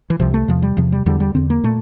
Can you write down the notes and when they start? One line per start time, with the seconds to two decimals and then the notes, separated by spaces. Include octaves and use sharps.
0.10 E3
0.20 C2 C3 F3
0.34 A3
0.48 E2 C3 F3
0.62 G3
0.77 E2 C3 F3
0.92 G3
1.06 E2 D3 G3
1.20 G3
1.35 E2 D3 C4
1.50 A#3
1.64 A#2 A3